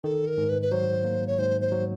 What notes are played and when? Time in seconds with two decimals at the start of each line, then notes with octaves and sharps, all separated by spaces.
0.04 D#3 A4
0.27 A#4
0.38 G#2
0.49 B4
0.62 B4
0.72 F#3 C5
1.04 A#3
1.27 C#5
1.39 G#2 C5
1.61 C5
1.71 F#3